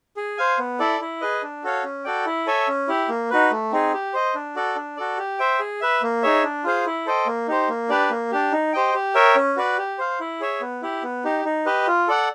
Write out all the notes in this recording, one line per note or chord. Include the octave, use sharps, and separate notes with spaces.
G#4
C5 F5 G#5
B3
E4 A4 D5
E4
G#4 B4 D#5
D4
F#4 A4 C#5 F5
C#4
F#4 A4 D5 G5
E4
A4 C#5 E5 G#5
C#4
E4 G4
A#3
D#4 F#4 B4
A3
C4 D#4 G#4
G4
C5 D#5
D4
F#4 A4 D5
D4
F#4 A4 D5
G4
C5 E5 G5
G#4
B4 E5
A#3
D#4 G#4 C#5 E5
D4
F4 G#4 C5 F5
E4
A4 C5 D#5 G5
A#3
D#4 G4 C5
A#3
D4 G4 B4 D5
A#3
D4 G4
D#4
G4 C5 D#5 G5
G4
A#4 C#5 E5 G5
C#4
F#4 B4 D5
G4
C5 F5
E4
G#4 C#5 E5
B3
E4 G4
B3
D#4 G4
D#4
G4 B4 D#5
F4
A4 D5 F#5